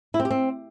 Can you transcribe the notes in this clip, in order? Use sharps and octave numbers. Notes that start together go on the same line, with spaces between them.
E4
C4
G4
C4